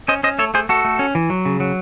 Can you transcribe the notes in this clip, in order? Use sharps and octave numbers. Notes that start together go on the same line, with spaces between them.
C#4 C5 D#5
C#4 C5 D#5
A3 A4 C#5
A3 G#4 C5
A3 F#4 A4
A3
C#4
E3
F#3
C#3
F#3